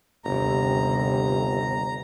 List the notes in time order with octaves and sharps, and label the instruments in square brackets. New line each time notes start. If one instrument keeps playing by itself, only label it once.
[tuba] G1 [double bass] D#2 C3 [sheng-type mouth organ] A#5